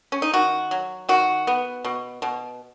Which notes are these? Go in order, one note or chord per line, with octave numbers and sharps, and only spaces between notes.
C#4
D#4
D#3 F#4
F#3
D#3 F#4
B3
B2
B2